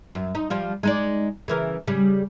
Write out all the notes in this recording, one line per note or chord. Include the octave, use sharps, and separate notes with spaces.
F#2
D#4
F3 G3 F4
G#3 D#4 D5
C#3 E3 A#4
C#3 G3